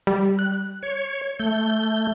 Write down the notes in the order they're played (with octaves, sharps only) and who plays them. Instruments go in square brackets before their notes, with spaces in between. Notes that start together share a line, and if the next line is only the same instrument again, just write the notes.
[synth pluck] G3
F#6
[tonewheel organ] C#5
A3 G6